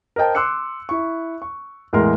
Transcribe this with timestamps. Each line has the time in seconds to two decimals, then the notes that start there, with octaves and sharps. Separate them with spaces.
0.16 A#4 C5 D#5 G5 A5
0.35 C6 D6 E6 F#6 C#7
0.89 E4 C#6
1.42 C#6
1.93 E2 A2 G#3 A#4 C6